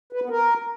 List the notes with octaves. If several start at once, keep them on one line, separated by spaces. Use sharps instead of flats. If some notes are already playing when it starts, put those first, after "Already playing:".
B4
B3
A#4